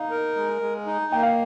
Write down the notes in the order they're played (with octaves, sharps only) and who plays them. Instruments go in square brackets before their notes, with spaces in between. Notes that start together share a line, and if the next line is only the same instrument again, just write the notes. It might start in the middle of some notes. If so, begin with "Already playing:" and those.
Already playing: [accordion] D#4 [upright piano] F5
[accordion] A#4
G#3
G#3
D#4
[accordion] A#3 [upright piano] G5
[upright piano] F5